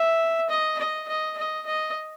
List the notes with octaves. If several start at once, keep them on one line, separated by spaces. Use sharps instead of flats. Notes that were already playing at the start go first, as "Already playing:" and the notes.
Already playing: E5
D#5
D#5
D#5
D#5
D#5